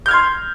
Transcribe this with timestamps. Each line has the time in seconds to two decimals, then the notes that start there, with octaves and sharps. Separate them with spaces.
0.06 G6
0.08 F6
0.11 G#6
0.13 C6